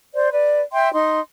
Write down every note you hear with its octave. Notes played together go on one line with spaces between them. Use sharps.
C5 D5
B4 D5
E5 G5 C6
D#4 C6